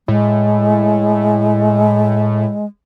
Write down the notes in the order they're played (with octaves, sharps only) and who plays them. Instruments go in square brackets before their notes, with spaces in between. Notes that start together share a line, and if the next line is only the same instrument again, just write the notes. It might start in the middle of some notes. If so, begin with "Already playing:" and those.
[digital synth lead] A2 [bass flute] G#3